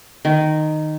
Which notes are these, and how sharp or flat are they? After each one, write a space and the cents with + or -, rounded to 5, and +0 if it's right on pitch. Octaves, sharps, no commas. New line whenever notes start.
D#3 -10